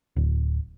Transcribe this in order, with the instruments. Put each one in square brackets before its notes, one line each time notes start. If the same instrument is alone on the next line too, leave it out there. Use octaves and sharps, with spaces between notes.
[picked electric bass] D1